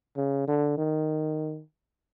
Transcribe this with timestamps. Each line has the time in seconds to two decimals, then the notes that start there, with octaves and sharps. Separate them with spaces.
0.17 C#3
0.48 D3
0.77 D#3